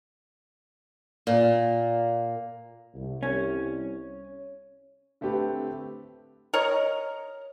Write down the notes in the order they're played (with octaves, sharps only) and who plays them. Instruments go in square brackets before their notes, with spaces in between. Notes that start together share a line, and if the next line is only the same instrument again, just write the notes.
[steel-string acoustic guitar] A#2
[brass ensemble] C2
[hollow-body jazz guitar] C#4
[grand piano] D3 A3 C4 G4 B4
[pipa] A#4 C#5 D#5